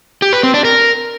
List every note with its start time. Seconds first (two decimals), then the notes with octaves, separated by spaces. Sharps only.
0.22 G4
0.33 B4
0.43 C4
0.54 D4
0.65 A#4